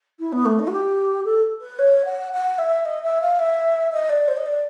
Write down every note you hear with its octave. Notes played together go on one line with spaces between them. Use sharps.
E4
B3
A3
D#4
F#4
G4
A4
B4
C#5
F#5
F#5
E5
D#5
E5
F5
E5
D#5
D5
C5
D#5
D5